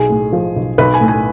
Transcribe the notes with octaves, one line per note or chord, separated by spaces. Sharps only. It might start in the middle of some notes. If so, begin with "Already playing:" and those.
Already playing: B1 G#4
A2
F3
B1
B1 B4
G#5
A2
G#5